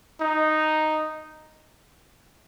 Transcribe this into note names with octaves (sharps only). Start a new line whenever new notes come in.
D#4